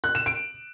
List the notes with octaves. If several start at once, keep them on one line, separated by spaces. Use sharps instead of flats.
F#6
E7
D7